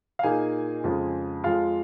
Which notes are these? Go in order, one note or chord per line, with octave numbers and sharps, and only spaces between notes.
F5
A#2 A#3 D#4 G#4 G#5
F2 C#3 G#3 F4
F2 F3 G#3 F4 F5